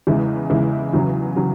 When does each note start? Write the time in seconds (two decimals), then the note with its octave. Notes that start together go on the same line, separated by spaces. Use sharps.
0.07 E2 C#3 G#3 E4
0.50 E2 C#3 G#3 E4
0.93 E2 C#3 F#3
1.36 C#3 F#3